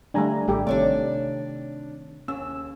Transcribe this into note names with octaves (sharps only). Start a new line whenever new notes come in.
D3 G3 A3 D4 G#5 A#5
A1 G3 G4 A4
C3 D#3 A3 D4 C#5 D5
D#2 C#4 E6